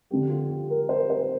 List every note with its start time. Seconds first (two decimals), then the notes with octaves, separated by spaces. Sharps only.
0.11 F2 D3 G4
0.30 F4
0.50 G4
0.70 A#4
0.89 C5
1.10 C5